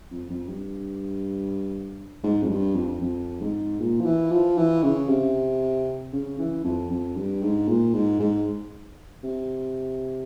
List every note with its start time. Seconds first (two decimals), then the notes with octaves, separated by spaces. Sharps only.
0.11 F2
0.30 F2
0.49 G2
2.23 G#2
2.42 F2
2.50 G2
2.75 F2
3.01 F2
3.41 G#2
3.79 A#2
4.00 F3
4.05 E3
4.31 F3
4.57 E3
4.83 C#3
5.09 C3
6.13 C#3
6.38 E3
6.64 F2
6.90 F2
7.16 G2
7.42 G#2
7.68 A#2
7.94 G#2
8.19 G#2
9.23 C3